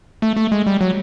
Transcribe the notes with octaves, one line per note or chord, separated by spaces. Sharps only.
A3
A3
G#3
G3
F#3